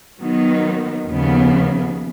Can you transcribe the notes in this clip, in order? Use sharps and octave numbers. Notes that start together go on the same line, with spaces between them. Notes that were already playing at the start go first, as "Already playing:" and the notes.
D#3 F#3 B3 D#4
D#2 C#3 F3 B3